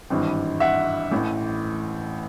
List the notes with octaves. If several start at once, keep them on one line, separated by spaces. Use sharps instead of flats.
G#1 G2 E3
E5 F#5
A1 A2 E3